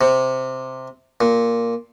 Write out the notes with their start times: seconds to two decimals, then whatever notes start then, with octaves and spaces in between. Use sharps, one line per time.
0.01 C3
1.21 A#2